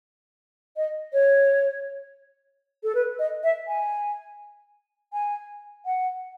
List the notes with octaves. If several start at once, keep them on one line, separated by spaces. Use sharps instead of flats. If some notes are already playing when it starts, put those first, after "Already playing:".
D#5
C#5
A4
B4
D#5
E5
G#5
G#5
F#5